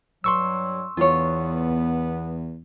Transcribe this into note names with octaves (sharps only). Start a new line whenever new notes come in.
G2 F#3 C6 C#6 E6
E2 B3 F4 C#5